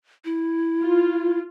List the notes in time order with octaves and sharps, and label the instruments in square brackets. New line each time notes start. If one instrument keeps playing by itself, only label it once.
[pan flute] E4
[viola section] F4